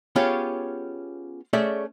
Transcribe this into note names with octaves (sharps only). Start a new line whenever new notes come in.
B3 C#4 F4 G4 G#4 C#5
A3 C#4 G#4 D5 E5